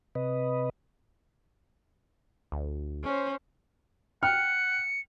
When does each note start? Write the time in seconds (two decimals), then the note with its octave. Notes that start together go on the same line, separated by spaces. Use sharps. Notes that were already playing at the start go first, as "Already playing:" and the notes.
0.15 C3 B4 D#5
2.52 D2
3.04 C#4 C5
4.23 F#5 G5 F6 C#7